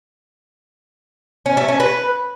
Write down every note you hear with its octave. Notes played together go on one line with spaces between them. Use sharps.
C#4
A3
C#4
B4